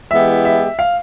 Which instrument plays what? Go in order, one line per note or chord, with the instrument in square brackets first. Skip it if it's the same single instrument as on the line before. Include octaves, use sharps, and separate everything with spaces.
[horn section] E3 G#3 B3 E4 G4 [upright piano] E5
[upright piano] E5
F5